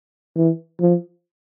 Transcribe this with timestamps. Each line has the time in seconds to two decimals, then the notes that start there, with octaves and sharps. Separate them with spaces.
0.36 E3
0.81 F3